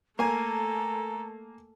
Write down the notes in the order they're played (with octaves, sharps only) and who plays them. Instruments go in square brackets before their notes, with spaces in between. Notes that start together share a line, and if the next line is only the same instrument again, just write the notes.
[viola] A3 A4 [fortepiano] A#3 G#5 [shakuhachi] A#5